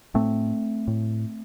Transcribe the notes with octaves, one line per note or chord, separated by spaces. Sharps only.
A2 A3 C4
A2